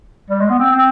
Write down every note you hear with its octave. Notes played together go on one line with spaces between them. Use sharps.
G3
G#3
B3
C4
C4